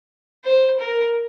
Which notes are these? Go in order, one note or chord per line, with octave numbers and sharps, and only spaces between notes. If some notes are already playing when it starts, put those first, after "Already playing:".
C5
A#4